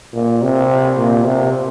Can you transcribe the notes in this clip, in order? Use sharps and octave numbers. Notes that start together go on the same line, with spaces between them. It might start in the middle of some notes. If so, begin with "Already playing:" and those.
A#2
C3
A#2
C3